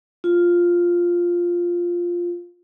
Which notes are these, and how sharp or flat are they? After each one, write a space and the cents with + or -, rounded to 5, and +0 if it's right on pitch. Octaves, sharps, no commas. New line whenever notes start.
F4 +0